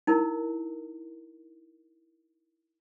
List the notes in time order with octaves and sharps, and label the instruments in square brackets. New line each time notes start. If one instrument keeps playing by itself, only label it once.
[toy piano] D#4 E4 A#4